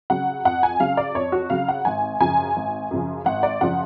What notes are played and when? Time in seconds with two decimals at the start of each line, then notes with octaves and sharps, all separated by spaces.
0.10 C#3 F#3 F#5
0.45 F2 F#5
0.63 G#5
0.80 C#3 F#3 F5
0.97 D5
1.15 F2 C#5
1.32 F#4
1.50 C#3 F#3 F5
1.68 F#5
1.85 G#1 G#5
2.20 F#2 C#3 F3 G#5
2.56 G#1
2.91 F#2 C#3 F3
3.25 G#1 F#5
3.43 D5
3.61 F#2 C#3 F3 F#5